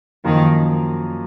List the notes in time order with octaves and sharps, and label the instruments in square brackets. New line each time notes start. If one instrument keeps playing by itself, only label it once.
[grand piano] F#2 F3 A#3 F4 [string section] D#3